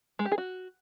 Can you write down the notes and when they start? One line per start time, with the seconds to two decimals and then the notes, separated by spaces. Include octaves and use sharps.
0.19 G#3
0.25 G4
0.32 G#4
0.38 F#4